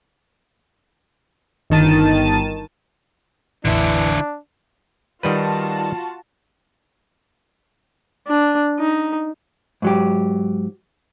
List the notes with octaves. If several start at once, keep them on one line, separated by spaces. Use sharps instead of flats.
G1 D#3 A5 D#7
A1 E2 D3 E3 D4 E4
D#3 G3 F4 F#4 B4 A5
D4
D#4
G#2 F#3 G4